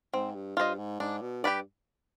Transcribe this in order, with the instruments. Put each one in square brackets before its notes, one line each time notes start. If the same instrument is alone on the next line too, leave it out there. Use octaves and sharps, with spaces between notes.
[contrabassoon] G#2 [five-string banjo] C4
[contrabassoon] G2
[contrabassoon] G2 [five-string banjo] F4 C5 D#5
[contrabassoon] G#2
[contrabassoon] G#2 [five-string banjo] D4
[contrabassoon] B2
[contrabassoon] G2 [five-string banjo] G4 B4 D5